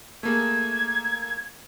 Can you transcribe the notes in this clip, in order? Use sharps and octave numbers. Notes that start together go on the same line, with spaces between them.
A3 A#3 G#4 G#6